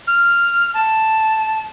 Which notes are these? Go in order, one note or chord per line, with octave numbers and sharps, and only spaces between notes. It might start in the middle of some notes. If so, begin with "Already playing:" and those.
F6
A5